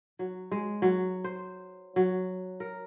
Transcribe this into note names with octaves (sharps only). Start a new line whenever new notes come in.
F#3
G#3
F#3
C5
F#3
A#4